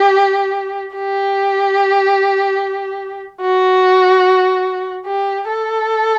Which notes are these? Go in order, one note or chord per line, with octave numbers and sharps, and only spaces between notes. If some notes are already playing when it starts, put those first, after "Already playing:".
Already playing: G4
G4
F#4
G4
A4